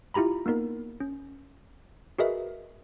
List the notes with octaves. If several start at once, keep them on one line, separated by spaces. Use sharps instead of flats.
E4 F4 G4 A#5 B5
A#3 B3 D#4 A#4
C#4
F#4 G#4 A#4 B4 D#5 E5